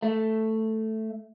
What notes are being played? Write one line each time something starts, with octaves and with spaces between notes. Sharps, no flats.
A3